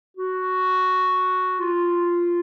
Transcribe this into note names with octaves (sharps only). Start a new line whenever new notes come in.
F#4
F4